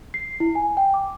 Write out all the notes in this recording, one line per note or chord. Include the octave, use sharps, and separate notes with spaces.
C7
E4
G#5
G5
D6